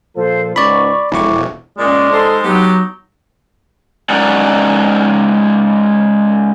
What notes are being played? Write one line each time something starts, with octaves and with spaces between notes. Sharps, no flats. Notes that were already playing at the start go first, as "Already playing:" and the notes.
A#2 F3 A4 C5
C#2 G#2 C#4 D5 B5 C#6
E1 F2 E4 C#6 D6
A#2 G#3 C#4 D5
G3 D#4 A4 C5
F#3 B3 D#4 G4
G#3 C#4 D#4 A#4 D5 F#5